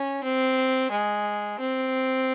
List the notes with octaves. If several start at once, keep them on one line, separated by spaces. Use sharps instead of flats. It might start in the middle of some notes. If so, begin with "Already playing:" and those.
Already playing: C#4
C4
G#3
C4